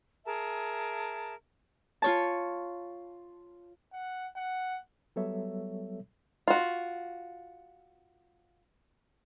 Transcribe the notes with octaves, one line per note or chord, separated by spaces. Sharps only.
G#4 A#4 E5 A5
F4 C#5 A5
F#5
F#5
F#3 G3 B3 A4 C#5 E5
F4 F#4